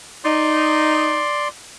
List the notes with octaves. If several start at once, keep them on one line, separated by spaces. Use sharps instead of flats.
D#4 D5 C6